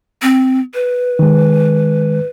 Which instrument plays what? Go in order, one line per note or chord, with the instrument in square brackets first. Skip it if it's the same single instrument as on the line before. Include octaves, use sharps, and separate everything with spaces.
[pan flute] C4
B4
[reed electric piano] D#3 G#3